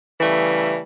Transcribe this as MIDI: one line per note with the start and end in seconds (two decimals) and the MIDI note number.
0.20 0.79 49
0.20 0.79 52
0.20 0.79 55
0.20 0.79 57